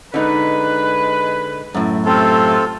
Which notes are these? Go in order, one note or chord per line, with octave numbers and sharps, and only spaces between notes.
D3 G#3 D#4 B4
F#2 A2
C3 A3 C4 F4 A4